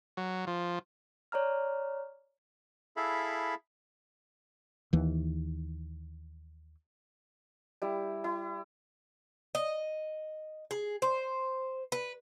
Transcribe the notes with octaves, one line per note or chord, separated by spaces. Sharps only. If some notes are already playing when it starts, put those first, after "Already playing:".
F#3
F3
C#5 D5 A#5 F6
E4 G#4 A4 E5 F5 B5
D#2 E3
G3 E4
E4
D#5
G#4
C5
B4